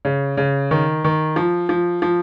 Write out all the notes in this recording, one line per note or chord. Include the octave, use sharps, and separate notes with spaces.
C#3
C#3
D#3
D#3
F3
F3
F3